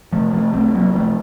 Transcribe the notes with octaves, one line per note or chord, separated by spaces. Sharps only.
C3 F3 A3
C3 F3 A3
C2 A3 C4
C2 F#3 A#3
C3 F3 A3